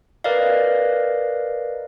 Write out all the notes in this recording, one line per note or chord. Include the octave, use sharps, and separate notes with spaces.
A#4 B4 D5 D#5 F5